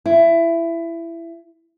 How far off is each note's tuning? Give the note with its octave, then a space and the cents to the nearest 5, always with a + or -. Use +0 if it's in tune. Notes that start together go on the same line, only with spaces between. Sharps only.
E4 +20